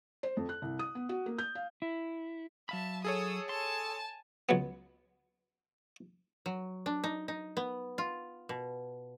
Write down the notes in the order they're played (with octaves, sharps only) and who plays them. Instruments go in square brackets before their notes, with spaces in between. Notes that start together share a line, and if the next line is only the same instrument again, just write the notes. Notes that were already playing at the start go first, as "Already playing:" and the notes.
[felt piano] C5
F2
F#6
C2
D#6
B3
F#4
A#3
G6
F5
[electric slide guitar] E4
[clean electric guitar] F#3 F5 B5 [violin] E5 A5
[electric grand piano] G#4 A4 C#5 [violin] D#6 E6
[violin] G#5 A5 [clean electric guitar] C6
[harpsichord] C#2 F#3 B3
[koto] F#3
D4
D#4
D#4
B3
F4
B2